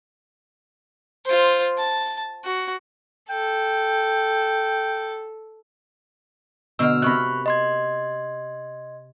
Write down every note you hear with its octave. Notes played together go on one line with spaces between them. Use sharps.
F4 C5
A5
F#4
A4 G5
B2 D3 C6 E6 F6
C3 A#4 B5 C#6 F#6
D#5 C6 G#6